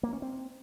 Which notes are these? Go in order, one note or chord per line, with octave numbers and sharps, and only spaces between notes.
A#3
C#4
C4